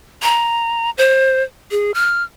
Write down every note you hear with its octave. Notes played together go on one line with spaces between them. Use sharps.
A#5
C5
G#4
F6